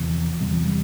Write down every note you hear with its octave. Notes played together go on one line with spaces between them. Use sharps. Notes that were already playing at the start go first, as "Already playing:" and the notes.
Already playing: E2 C3 F3
E2 C3 G3
F3
G3